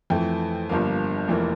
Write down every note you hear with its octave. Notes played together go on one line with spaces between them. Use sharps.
F2 E3 A3 G5
G1 G2 F3 A#3 F5
F1 F2 E3 A#3